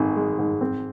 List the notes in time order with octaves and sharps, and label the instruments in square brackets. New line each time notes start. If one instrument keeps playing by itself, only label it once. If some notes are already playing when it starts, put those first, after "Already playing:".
Already playing: [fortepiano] G#1 D#3
G#3
G#2
C4